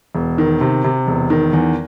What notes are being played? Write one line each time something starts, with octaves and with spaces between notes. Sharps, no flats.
E1
D#3
C3
C3
E1
D#3
E2